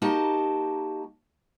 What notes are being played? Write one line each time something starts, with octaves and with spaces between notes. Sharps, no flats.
A#3 D#4 F#4 G4 D#5 A5